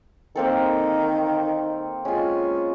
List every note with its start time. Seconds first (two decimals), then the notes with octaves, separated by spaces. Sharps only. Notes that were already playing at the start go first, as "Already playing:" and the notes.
0.35 D#3 A#3 C4 A4
2.05 G#3 C#4 F4